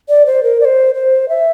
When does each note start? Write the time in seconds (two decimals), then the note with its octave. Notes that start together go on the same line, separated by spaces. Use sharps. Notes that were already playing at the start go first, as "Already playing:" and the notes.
0.09 D5
0.26 C5
0.43 A#4
0.61 D5
0.65 C5
0.95 C5
1.29 E5